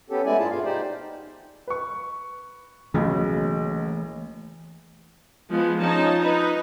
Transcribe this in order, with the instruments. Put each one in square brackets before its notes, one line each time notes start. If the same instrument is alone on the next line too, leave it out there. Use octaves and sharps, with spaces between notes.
[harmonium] B3 C#4 G4 A4
G#3 A3 B3 E4 D5 G#5
G2 F4 G#4 A5
B2 B3 F4 F5
D#4 G4 C5 D5
[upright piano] B4 C#6
[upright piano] B1 C#3 [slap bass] E3 A3 A#3
[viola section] F3 G#3 B3
F3 C#4 D#4 A5
D#4 B4